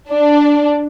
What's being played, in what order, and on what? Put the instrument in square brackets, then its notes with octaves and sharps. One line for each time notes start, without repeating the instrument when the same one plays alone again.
[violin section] D4